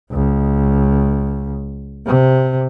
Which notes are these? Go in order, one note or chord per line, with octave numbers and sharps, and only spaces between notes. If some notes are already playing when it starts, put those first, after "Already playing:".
C#2
C3